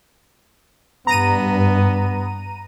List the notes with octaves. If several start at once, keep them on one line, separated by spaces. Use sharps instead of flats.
G2 B3 A#5 D#7